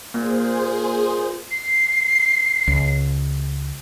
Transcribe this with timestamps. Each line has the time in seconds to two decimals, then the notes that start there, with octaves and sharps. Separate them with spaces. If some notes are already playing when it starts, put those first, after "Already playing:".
0.14 A#2 A#3 G#4 C5
1.51 C7
2.67 C#2